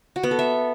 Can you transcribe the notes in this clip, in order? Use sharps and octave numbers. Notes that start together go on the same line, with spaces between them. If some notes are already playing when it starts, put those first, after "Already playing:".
F#4
B3
A4
E5